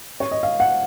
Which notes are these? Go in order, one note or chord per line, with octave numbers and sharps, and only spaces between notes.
C#5
D#5
F5
F#5